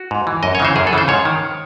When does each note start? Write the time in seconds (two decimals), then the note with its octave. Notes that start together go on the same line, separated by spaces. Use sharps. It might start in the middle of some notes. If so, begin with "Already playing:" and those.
Already playing: F#4
0.11 G#2
0.27 E3
0.43 F#2 D#5
0.55 C#5
0.60 C#3 E3 C5
0.76 F#2 G#4
0.87 A4
0.93 C#3 E3 C5
1.08 G#2 C#5
1.25 D#3